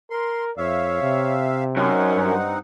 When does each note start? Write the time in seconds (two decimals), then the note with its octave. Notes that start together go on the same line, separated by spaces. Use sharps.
0.10 A#4 C6
0.58 F2 C#5 E5 F5
1.02 C3
1.76 F#2 C4 C#4 D#4 F#5
2.16 G2